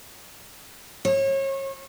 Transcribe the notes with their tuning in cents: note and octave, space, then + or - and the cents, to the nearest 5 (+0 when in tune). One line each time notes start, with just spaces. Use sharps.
C#5 -35